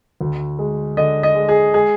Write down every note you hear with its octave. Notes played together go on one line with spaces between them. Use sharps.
D2
G#3
D3 D#5
D#5
G#3
G#4
G#3 G#4